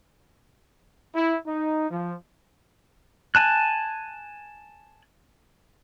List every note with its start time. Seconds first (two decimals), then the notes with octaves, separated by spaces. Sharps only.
1.15 E4
1.47 D#4
1.91 F3
3.35 G#5 A5 F#6